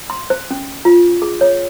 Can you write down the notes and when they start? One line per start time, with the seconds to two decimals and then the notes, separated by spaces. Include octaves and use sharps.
0.10 C6
0.30 C5
0.51 C#4
0.85 F4
1.22 G#4
1.41 C#5